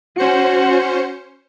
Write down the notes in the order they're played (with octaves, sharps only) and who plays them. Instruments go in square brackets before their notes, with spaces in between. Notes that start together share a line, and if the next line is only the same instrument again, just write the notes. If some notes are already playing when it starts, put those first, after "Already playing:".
[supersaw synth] C#4 C5 C#7 [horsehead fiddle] F#4